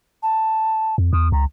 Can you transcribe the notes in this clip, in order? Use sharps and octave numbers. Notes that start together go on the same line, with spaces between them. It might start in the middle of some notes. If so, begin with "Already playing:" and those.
A5
F2
E2 D#6
C#2 A#5